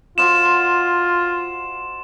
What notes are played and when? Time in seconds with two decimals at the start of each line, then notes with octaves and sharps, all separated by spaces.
0.18 F4 F#4 C5 D#5 E7